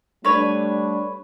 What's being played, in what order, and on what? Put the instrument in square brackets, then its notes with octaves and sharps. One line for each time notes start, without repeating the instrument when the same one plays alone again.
[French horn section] G3 A3 D4 [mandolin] B4 C#5